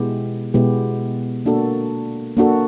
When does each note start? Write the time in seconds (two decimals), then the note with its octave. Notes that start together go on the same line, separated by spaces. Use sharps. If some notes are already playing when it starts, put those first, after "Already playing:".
Already playing: B2 G#3 B3 E4 G4
0.54 B2 G#3 B3 E4 G4
1.46 A#3 D4 F#4 A4
2.37 A#3 D4 F#4 A4